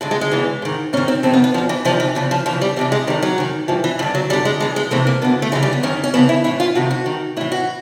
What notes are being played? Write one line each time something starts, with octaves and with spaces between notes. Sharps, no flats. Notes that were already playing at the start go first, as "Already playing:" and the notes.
G2 D3 G#3
G#3
G#3
E2 C#3 E3
G#2 D#3
G#2 D#3 C#4
C4
F2 C3 D#3 C4
B3
B3
E2 B2 F3
E3
E2 C3 D#3 F3
E3
E2 C#3 E3 F3
F3
F2 C#3 E3 F3
G3
F2 C3 E3 G3
G#3
G2 D#3 G3
F#3
F#2 D#3
G2 E3 F3
E3
G2 D3 F3
F#3
F#2 D3 G3
G#3
G2 E3 G#3
G#3
F2 C3 E3 A3
A#3
F#2 D3 B3
A3
F#2 C#3 E3 G#3
G3
B3
F#2 D#3 C#4
C#4
F2 C#3 E3 B3
E4
A2 E3 E4
F4
F2 C3 D#3 F#4
F#4
G2 D#3
A2 E3 E4
F#4